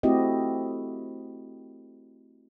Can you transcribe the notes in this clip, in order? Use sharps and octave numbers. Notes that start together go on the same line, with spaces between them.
A3 C4 E4 F#4 G4 D#5